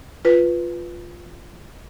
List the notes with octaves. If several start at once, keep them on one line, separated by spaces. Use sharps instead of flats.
F4 B4